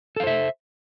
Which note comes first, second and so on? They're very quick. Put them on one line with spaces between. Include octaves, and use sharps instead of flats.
A4 F5 C5 E5